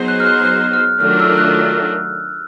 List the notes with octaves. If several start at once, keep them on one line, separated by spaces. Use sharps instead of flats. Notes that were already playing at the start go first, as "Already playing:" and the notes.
Already playing: F#3 B3 D#4 G#4 C5
F#6
F6
F#6
F#6
F6
D#3 F#3 A3 D4 F4 F6
E6
F#6